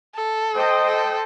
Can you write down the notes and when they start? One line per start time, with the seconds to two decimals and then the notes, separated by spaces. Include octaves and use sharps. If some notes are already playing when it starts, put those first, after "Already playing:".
0.15 A4
0.54 C5 D#5 G5
0.87 A4